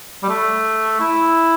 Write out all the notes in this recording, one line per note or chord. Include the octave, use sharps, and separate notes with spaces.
G3
A3
E4